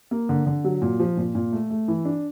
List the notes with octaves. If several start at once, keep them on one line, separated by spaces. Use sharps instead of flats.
A#3
D3
D3
F#3
A#2
F3
A#2
A#2
A3
A3
E3
D4